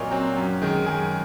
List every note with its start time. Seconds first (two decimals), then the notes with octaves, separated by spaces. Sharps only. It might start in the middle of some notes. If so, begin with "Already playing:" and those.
Already playing: A#2 F#3 C4 A#4 C#5 D#5
0.11 F#3 C4
0.36 F#2
0.62 D#3 G#3
0.86 F#2 G#4